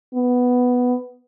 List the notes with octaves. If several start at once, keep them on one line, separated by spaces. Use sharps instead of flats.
B3